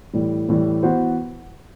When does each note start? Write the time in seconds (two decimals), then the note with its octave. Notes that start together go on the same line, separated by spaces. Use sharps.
0.13 A2 E3 G3
0.49 A2 E3 G3
0.83 E3 B3 F#4 C5